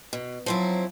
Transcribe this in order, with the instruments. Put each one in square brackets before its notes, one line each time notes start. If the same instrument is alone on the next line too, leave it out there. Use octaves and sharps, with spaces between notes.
[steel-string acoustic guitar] B2
[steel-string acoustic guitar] F3 C4 E4 [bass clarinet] F#3